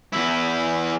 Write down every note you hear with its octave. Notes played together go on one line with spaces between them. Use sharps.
E2 E4